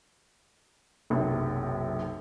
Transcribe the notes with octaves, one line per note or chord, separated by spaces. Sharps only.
F#1 B1 C3